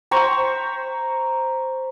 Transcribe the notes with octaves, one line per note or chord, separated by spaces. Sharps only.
C5 A#5 B5 C#6